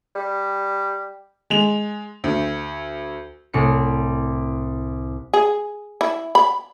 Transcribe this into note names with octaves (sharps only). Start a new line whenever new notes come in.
G3
G#3 F7
D2
C2 A2 C7 C#7
G#4
E4
B5